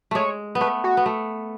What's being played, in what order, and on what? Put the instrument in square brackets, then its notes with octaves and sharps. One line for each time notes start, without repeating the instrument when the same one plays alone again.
[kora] G#3 A3 [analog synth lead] C#5
[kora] B3
[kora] A3 [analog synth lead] B4
[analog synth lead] F#4
[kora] B3
A3